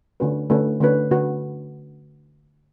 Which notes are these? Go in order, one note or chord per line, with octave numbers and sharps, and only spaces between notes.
D3 A3 C#4 F#4 B4
D3 A3 C#4 F#4 B4
D3 A3 C#4 F#4 B4
D3 A3 C#4 F#4 B4